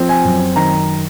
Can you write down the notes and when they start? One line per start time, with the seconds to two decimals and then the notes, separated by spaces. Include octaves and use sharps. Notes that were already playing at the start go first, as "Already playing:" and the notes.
Already playing: F3 C4
0.09 G#5
0.25 F#2
0.56 D#3 A#5